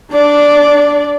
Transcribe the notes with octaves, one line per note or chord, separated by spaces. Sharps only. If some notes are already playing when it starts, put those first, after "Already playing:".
D4 D5